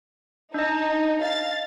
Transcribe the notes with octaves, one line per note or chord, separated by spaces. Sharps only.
D4 D#4 D#5
F5 A6